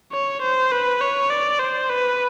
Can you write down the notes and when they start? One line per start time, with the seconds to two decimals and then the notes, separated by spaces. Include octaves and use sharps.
0.13 C#5
0.42 C5
0.72 B4
1.01 C#5
1.30 D5
1.59 C5
1.90 B4